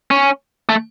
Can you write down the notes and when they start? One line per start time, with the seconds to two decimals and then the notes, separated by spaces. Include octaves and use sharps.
0.11 C#4
0.69 A3